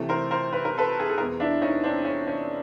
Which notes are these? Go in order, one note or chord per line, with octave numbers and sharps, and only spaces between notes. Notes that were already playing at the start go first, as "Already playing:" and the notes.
Already playing: C3 E3 A3
A#4 C5
A#4 C5
B4
A#4
A4 B4
G#4
A4
E2 B2 G#3 G#4 A#4
D4 E4
C#4 D#4
C4 D4
C#4
C#4